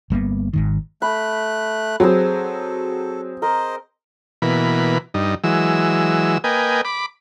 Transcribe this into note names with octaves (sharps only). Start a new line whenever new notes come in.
G1 G3 A#3 B3
G#1 G#2 D#3
A3 B5 F#6
F#3 C4 G#4 A4 C5
A#4 C5 D#5
B2 E3 A#3 B5
G2 D#4
E3 F#3 G#3 E6
A#3 B4 D#5 G5 G#5
B5 D6